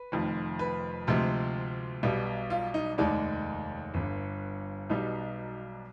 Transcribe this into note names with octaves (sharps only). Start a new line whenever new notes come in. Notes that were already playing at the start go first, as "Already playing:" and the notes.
Already playing: B4
F1 F2 D#3
B4
D2 C3 F3 G#3
B1 B2 G3
F4
D#4
F1 D#2 D#3 G#3 D5
G1 G2 D3
B1 B2 G3 D#4